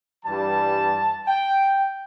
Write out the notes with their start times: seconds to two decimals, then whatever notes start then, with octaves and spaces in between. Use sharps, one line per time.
0.24 G2 E3 G3 A5
1.28 G5